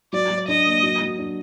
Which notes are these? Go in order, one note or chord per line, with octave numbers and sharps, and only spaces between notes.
F#3 D5
F#3
D4 D#5
A#3
F#3
F#3
D4